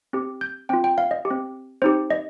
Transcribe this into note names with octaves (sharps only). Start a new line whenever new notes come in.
C4 G4
G6
C4 F4 G5
G5
F5
D#5
G4
C4
C4 D#4 G4 C5
D#5